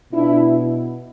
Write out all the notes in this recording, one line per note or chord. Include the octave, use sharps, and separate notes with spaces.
B2 D4 E4